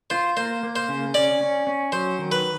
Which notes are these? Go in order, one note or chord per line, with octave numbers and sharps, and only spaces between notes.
F4 C5
A#3 C5
A#3
C5
C#3
C#4 D5
C#4
C#4
F#3 C5
D#3
B4